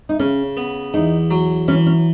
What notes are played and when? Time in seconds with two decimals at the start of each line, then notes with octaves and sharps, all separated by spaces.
0.09 D#4
0.19 C#3 C#4
0.57 B3
0.94 E2 D#4
1.31 F#3
1.68 E3 C#4
1.86 C#4